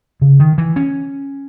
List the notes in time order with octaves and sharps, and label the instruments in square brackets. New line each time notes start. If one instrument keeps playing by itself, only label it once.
[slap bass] C#3
D#3
E3
C#4